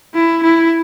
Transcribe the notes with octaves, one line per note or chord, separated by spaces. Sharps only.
E4
E4